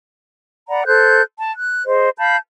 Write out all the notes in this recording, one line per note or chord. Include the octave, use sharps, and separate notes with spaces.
D5 F#5 A#5 B5
A4 C5 F#6 G6
A5
F#6
G#4 C5 D#5
F5 A5 B5 G6